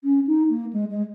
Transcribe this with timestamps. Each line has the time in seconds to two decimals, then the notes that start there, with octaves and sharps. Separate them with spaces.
0.04 C#4
0.27 D#4
0.49 A#3
0.72 G#3
0.90 G#3